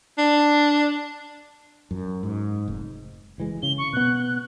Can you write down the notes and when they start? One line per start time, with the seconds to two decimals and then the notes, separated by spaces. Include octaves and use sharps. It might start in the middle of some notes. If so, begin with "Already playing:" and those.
0.18 D4
1.91 F#2
2.23 G#2
2.68 F1
3.38 F#1 E3 G#3
3.63 C#3 G7
3.78 C#6
3.93 B2 B3 F#6